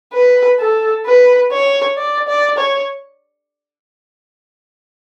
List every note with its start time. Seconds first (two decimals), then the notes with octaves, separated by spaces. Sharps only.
0.13 B4
0.59 A4
1.06 B4
1.52 C#5
1.97 D5
2.28 D5
2.58 C#5